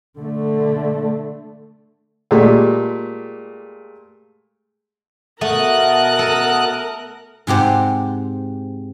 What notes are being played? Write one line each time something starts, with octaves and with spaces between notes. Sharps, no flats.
D3 A3
A#2 G#3 A3 G4
B2 A3 A#4 F#5 A5 D#6 F#6
A4
G#2 C3 G4 C5 F#5